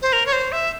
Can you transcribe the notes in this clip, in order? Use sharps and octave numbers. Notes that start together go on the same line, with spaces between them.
C5
A#4
C#5
C5
E5